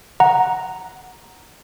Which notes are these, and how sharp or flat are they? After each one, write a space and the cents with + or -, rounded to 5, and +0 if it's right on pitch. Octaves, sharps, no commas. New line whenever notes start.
F#5 +0 A#5 +0